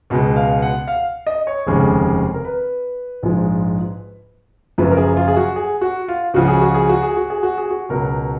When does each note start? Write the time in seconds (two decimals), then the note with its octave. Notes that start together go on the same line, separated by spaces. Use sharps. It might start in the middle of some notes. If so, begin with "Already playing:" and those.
0.10 C#2 B2 G#3
0.36 F5
0.62 F#5
0.88 F5
1.27 D#5
1.47 C#5
1.66 F1 D#2 C#3 G#3
2.34 A#4
2.45 B4
3.23 A#1 G#2 F3 G#3
4.78 F#1 F#2 F3 B4
4.91 A#4
4.97 G#4
5.17 F4
5.28 G#4
5.37 F#4
5.56 G#4
5.81 F#4
6.08 F4
6.34 C#2 C#3 F3 F#4
6.48 G#4
6.62 F#4
6.75 G#4
6.89 F#4
7.03 G#4
7.17 F#4
7.30 G#4
7.43 F#4
7.58 G#4
7.70 F#4
7.89 C#2 B2 F#3 A#4